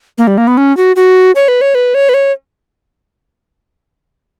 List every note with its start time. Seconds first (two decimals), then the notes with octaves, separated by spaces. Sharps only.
0.18 A#3
0.27 G3
0.38 A#3
0.47 B3
0.57 C#4
0.77 F#4
0.96 F#4
1.35 C#5
1.48 B4
1.61 C#5
1.75 B4
1.94 C#5
2.09 B4
2.14 C#5